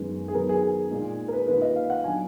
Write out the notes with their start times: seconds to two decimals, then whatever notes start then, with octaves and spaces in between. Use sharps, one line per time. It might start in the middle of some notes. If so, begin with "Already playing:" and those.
Already playing: F#2 D#3 G#3 B3
0.28 G#4
0.34 D#3 F#3 B3 A#4
0.49 G#4
0.63 G#4
0.91 A#2 G#3 D#4
1.28 A#4
1.33 B4
1.48 D#3 A#3 F4 B4
1.62 D#5
1.76 F5
1.90 F#5
2.04 D#3 F#3 B3 D4 G#5